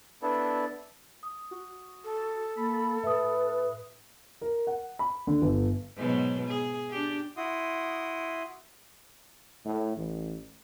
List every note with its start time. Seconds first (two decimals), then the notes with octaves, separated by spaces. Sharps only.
0.22 B3 D4 E4 A4
1.23 D#6
1.51 F#4
2.04 A4
2.56 A#3 B5
3.03 A2 B4 E5 D#6
4.41 A#4
4.67 F#5
4.99 B5
5.27 D3
5.42 G1
5.96 G#2 B2 F#3
6.47 G#4
6.91 D4 G4
7.37 E4 F#4 C6 D#6
9.65 A2
9.97 A1